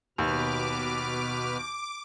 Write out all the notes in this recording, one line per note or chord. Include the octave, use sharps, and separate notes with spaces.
D#2 B2 B4 D6 F6